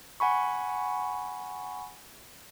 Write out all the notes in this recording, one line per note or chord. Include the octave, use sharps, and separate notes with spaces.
F#5 G#5 B5 C#6